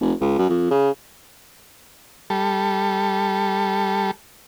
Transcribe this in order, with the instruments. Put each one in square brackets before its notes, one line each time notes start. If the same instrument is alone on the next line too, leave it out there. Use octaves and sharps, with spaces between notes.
[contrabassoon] F1
C#2
F#2
F2
C#3
[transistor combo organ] G3 A4